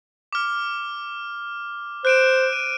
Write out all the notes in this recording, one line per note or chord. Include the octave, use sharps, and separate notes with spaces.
D6 F6
C5 F#6 D7 E7
D#7